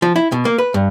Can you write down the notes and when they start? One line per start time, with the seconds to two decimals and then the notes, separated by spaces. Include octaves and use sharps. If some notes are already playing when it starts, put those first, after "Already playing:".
0.02 F3
0.16 E4
0.32 B2
0.45 A#3
0.58 B4
0.74 G2